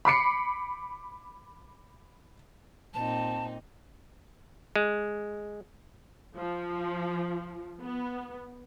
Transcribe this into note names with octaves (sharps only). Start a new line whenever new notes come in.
B5 D6 C7 C#7
A#2 C4 D#4 A5
G#3
F3
B3